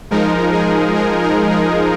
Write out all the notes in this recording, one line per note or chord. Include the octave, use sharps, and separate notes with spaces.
F3 G#3 D#4 A#4
G#4
A#4
A#4
G#4